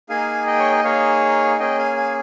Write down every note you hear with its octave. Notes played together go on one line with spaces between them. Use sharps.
A#3 D#4 G#4 F5 G#5
D#5 G5
C#5
D#5
A#3 D#4 G#4 C#5 F5
A#3 C#4 G#4 D#5 G5
F5 G#5
F5 G#5